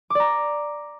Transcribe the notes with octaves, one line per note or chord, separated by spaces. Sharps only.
D5 A#5 D6